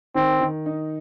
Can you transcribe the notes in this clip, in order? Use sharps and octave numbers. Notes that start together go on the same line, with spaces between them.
D#3 C4
D#3
D#4